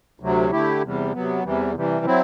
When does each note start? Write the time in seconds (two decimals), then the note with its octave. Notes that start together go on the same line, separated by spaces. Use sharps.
0.20 D2 C3 F#3
0.51 D3 A3 E4 G4
0.82 E2 C3 G3
1.13 C3 F#3 B3
1.44 E2 C3 E3 G3
1.75 C3 E3 G3
2.05 F#3 C4 E4